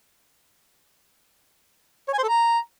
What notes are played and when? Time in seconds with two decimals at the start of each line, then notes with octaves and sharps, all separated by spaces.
2.08 C#5
2.13 G#5
2.18 C5
2.23 A4
2.28 A#5